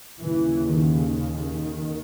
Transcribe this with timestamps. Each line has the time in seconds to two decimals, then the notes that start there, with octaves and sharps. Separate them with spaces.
0.20 D#2 C#3 E3
0.63 D#3
1.05 D#3